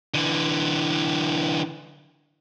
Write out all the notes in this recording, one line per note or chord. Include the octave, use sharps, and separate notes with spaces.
D3 E3